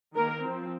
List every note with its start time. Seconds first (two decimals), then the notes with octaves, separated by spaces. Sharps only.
0.14 D#3 A#3 A#4
0.42 F3 C4